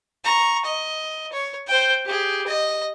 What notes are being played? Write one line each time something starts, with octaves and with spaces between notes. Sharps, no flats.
A#5 C#6
D#5
C#5
C5 G5
G4 G#4
D#5